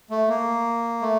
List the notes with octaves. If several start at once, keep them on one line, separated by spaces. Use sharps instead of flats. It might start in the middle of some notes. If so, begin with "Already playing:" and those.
A3
A#3
A3